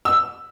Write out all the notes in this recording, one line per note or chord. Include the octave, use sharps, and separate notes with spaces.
E6